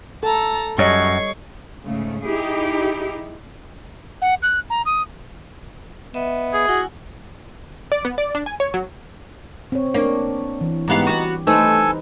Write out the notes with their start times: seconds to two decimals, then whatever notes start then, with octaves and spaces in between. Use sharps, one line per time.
0.23 A4 A5 A#5
0.78 F#2 G3 C#5 D#5 C#6 C7
1.84 G#2 C#3 A3
2.25 D#4 E4 G4 G#4
4.22 F#5
4.43 F#6
4.70 A#5
4.86 D#6
6.14 B3 D#5 E5
6.53 G#4
6.68 E4 F#4 F#5 G#5
7.92 D5
8.05 B3
8.18 D5
8.35 D4
8.46 G#5
8.60 C#5
8.74 F#3
9.72 C4 C#5
9.94 A#3 D4 C#5
10.61 E3
10.88 G#2 G3 B3 D#4 G4 F5
11.07 B3 F#4
11.47 A3 D#4 A4 B4 C5 G#5 E6